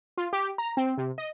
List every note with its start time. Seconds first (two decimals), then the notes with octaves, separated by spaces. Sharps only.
0.17 F4
0.33 G4
0.58 A#5
0.77 C4
0.98 C3
1.18 D#5